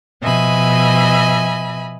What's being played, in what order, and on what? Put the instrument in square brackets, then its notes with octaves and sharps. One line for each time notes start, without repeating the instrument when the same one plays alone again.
[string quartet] B2 F3 D#5 E5 G#5 B5